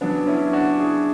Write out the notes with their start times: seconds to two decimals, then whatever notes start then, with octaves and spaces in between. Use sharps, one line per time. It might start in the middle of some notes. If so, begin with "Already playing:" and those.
0.01 C#3 F#3 B3 D4
0.27 C#4 E4
0.53 D4 F#4
0.80 E4 G#4